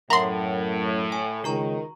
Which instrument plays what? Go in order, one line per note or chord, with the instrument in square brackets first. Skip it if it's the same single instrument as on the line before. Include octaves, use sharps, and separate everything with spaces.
[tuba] F#2 [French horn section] A2 [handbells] A#4 E5 F#5 [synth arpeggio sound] A#5 C6
[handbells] G#5
[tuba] C#2 [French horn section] D#3 [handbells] F#4 A#5 C#6